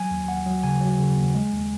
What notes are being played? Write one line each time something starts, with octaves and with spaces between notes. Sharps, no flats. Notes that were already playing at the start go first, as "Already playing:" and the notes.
Already playing: F#3 G#5
D#2
D#2 F#5
F#3
C#3 G#5
F#3
C#3
D#2
G#3
D#2